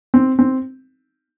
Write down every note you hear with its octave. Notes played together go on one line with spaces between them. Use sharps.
C4
C4